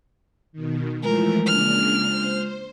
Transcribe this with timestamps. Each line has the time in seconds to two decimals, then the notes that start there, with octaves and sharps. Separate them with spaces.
0.52 B2 D#3
1.03 E3 F3 G#3 A3 F4 A#4
1.47 C#3 A#3 D4 F6
2.05 C5